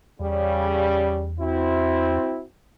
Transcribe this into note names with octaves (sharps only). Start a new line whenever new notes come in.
E2 C#3 G3
C4 E4 F#4